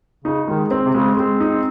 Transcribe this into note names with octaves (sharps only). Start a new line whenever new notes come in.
C#3 D#4
D#3 G#3
C4
C3
C#3 G#3
G#3 C4
D#4
C4